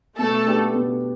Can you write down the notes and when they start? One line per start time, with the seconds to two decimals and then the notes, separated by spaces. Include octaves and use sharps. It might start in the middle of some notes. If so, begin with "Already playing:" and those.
0.18 B2 A3 A4
0.46 B3 D4 G4
0.74 B2